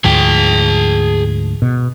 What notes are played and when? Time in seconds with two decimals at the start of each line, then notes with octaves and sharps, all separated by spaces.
0.04 D2 G#2 F3 G#4 G5
1.62 B2